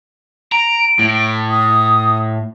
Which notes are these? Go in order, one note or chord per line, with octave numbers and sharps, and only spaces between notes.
A#5 D7
A2
D#6